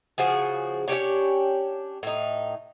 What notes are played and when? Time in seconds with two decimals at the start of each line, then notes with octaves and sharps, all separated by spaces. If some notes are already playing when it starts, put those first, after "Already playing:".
0.18 C#3 F3 F#4 G#4
0.88 C#4 D4 G4 C#5
2.03 A2 D#4